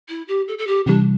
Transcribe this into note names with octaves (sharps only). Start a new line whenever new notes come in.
E4
G4
A4
A4
G4
C3 E3 G3 D4